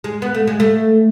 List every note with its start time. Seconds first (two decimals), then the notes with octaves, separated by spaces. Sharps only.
0.04 G#3
0.22 B3
0.34 A3
0.47 G#3
0.60 A3